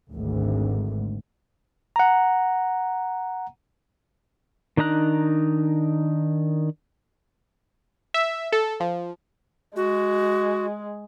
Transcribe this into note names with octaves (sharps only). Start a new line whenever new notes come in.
G#1 D2
F#5 A#5
D#3 D4 D#4 A#5 F#6
E5
A4
F3
G#3 F#4